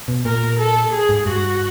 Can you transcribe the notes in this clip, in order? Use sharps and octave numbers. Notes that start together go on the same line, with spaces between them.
B2
A#2 A#4
A4
G#4
G#2
G2 F#4